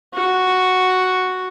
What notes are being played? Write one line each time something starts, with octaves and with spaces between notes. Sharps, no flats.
F#4